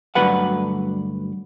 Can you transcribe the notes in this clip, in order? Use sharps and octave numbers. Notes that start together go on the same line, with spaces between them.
D2 G2 D3 F#3 B4 F#5